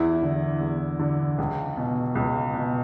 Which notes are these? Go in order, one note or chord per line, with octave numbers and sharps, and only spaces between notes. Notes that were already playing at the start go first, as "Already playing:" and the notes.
Already playing: E2 E4
D3
E2
D3
C#2
B2
C#2
B2